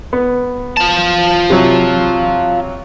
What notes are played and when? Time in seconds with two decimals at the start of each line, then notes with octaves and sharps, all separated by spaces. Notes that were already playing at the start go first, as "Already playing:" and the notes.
0.13 B3
0.77 F4 A5
1.50 C3 F#3